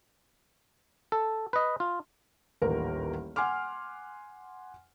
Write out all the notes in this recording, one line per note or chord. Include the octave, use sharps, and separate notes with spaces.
A4
B4 D#5
F4
D#1 A1 A#4
F#5 G#5 C6 D6 F6